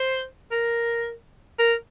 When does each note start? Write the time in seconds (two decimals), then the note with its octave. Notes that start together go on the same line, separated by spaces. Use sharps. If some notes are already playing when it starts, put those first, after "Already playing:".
Already playing: C5
0.51 A#4
1.59 A#4